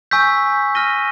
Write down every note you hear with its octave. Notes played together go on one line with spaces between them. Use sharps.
G#5 C#6 E6 G6 B6
F6 A#6 D#7 G7